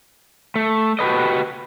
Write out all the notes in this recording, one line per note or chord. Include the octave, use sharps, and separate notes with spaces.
A3
F#4 G4 A4 B4 D#5